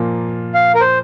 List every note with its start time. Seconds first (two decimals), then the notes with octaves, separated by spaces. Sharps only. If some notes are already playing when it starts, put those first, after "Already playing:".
Already playing: A#2 F3 A#3 F4
0.54 F5
0.75 A#4
0.81 C5